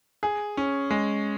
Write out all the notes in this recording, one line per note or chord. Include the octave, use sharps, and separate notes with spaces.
G#4
C#4
G#3